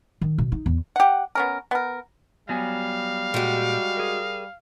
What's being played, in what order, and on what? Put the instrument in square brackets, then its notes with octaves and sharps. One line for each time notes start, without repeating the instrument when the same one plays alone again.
[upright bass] D#3
B2
D#4
E2
[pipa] G4 F#5
B3 C#4 A#4
B3 A#4
[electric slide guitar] F#3 B3 G#5 [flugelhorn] G3 [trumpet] F5
[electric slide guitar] A#2 G4 [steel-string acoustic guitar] G#3 F#4
[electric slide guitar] G#4 A#4